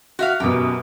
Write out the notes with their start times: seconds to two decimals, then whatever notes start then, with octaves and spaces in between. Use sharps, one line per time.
0.19 F#4 E5 F5
0.40 F#2 B2 G4